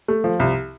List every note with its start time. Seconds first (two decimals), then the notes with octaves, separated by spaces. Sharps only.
0.08 A3
0.24 F3
0.40 C2